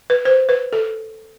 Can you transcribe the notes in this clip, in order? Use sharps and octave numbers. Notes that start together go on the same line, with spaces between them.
B4
C5
B4
A4